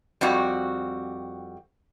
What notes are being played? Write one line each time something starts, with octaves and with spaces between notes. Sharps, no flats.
F2 G3 C4 F#4